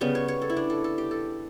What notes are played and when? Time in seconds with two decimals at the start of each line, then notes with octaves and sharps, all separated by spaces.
0.01 C#3 G3 B3
0.15 C#5
0.28 C#5
0.42 A4
0.50 E4
0.57 D4
0.70 A4
0.84 A4
0.98 G4
1.11 A4